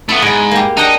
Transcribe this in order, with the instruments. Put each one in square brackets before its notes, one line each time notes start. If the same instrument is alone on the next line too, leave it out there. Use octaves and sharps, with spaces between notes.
[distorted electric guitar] A3 B3 [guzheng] E4
[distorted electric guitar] G#2 [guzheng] G#3 B3
[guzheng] A#3 G4
[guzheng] D4 F#5 G5 [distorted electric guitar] D#4